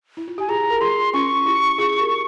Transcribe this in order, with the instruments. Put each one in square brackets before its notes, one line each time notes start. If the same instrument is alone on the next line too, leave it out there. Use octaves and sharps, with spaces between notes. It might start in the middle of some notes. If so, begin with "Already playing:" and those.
[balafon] E4
F4
[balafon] G4 [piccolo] G#5
[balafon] F4 G#4 [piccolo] A#5
[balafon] A#4
[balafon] F4 G#4 [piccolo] C6
[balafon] C#4 F4 [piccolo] C#6
[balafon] E4 G4
F4 G#4
G4 A#4